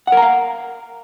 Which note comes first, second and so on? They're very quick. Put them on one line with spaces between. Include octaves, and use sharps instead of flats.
F#5 A#4 A#5 F5